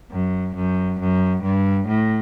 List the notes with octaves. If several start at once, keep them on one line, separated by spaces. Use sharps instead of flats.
F#2
F#2
F#2
G2
A2